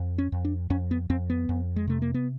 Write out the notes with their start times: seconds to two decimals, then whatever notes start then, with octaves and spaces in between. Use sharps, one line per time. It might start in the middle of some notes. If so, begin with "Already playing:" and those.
Already playing: F2
0.18 C#4
0.32 F2
0.45 D4
0.70 F2 C#4
0.91 B3
1.10 F2 C4
1.30 B3
1.49 F2
1.76 G#3
1.88 C3 A3
2.02 A#3
2.14 B3